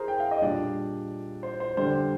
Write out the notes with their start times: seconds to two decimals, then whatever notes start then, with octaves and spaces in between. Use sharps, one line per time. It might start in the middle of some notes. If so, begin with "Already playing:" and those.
Already playing: G#4 A#4 C5
0.08 G5
0.20 F5
0.31 D#5
0.42 A#2 G3 D4 D5
1.43 C5
1.60 C5
1.77 D3 G3 D4 C5